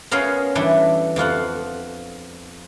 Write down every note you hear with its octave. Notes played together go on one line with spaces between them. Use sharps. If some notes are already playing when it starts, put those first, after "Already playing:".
B3 C#4 F4 G#4 A#4 C#5
E3 G3 D4 A4
F2 F3 F4 F#5